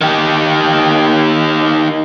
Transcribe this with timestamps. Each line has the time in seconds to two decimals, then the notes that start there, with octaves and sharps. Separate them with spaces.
0.01 D#3 G4